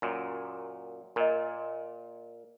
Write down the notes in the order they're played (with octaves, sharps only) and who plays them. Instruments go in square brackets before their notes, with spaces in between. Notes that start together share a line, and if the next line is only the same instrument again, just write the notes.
[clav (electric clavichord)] F#2 A#2
[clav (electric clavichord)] A#2 [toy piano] A#4 D#5